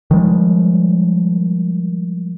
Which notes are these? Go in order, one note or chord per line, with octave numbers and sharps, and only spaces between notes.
D#3 F3 G3 G#3